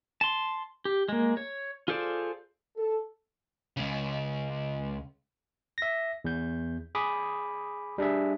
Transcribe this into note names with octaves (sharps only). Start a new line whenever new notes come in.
A5 C6
G4
G#3 A#3
C#5
F4 G#4 A4 C5 D5
A4
C#2 C#3
E5 A#6
E2 G6
G#4 B5 D6 D#6
G3 D4 G#4 E5